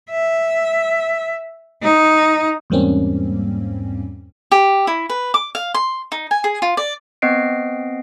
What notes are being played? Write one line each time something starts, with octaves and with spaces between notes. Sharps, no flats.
E5
D#4
E2 G#2 G3 A#3 C4 C#4
G4
E4
B4
D6
F5
C6
D#4
G#5
G#4
F4
D5
B3 C4 D#5 C7 D7